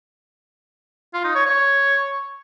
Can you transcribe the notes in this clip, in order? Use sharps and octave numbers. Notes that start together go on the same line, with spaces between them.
F4
D#4
C#5
C#5